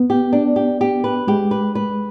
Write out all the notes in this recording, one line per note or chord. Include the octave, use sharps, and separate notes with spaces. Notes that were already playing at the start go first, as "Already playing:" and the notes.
Already playing: B3
G4
D4
G4
G4
B4
G#3 G4
B4
B4